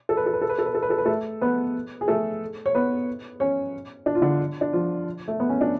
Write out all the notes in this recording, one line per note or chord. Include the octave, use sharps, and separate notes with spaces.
A4
B4
A4
B4
A4
B4
A4
B4
A4
B4
A4
B4
A3 A4
B3 B4
G#4
A3 A4
C#5
B3 B4
C#4 C#5
D4
F4
D3 D4
D4
F3 F4
A3
B3
C#4
D4